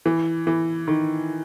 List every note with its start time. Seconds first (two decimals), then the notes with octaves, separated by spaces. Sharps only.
0.06 E3
0.47 E3
0.88 D#3